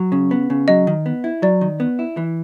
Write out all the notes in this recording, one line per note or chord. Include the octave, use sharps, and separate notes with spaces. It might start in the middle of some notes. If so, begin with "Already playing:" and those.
Already playing: F#3
C#3
B3
C#3
F#3 D#5
D#3
B3
E4
F#3 D5
D#3
B3
E4
E3